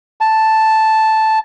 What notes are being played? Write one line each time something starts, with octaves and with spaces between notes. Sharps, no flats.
A5